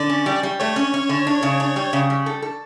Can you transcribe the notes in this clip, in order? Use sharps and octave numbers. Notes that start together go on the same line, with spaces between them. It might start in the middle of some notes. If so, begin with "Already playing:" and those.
Already playing: D3 D5
C#4
G3
G3
A3 C#5
C#4
C#4
D3
D4
C#3
D4
G3
C#3
G3
A4
A4